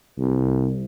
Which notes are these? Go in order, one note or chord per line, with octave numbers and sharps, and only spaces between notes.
C2